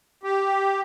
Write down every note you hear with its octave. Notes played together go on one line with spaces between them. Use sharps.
G4